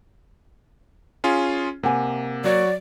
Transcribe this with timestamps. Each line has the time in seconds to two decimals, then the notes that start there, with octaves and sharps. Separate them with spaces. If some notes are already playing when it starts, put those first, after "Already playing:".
1.24 C#4 F4 G#4
1.83 C3 A#3 F#5 G#5
2.44 F#3 F#4 C#5 D5